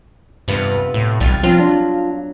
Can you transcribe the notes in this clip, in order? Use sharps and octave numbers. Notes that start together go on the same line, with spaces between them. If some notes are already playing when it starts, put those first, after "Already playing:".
G2 C3 B3 F4
A2
B1 G3 F4
F3 F#3 C4 F4
D4